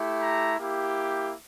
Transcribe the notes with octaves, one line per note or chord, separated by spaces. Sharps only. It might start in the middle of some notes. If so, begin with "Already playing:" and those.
Already playing: A3 E4 G4
A#5
A#3 E4 G4